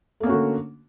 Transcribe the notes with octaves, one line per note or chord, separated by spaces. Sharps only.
D3 A3 A#3 C#4 F#4